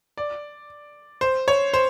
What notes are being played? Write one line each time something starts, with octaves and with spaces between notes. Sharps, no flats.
D5
C5
C#5
C5